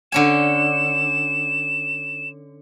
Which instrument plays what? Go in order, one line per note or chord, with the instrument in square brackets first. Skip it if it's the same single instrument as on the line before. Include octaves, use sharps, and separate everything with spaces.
[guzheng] D3 C#4 G#5 [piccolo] E7